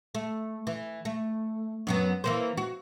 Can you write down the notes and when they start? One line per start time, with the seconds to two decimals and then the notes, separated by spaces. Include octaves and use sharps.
0.15 A3
0.67 E3
1.05 A3
1.87 F#2 F#3 B3
2.24 E3 A#3 C5
2.57 F#4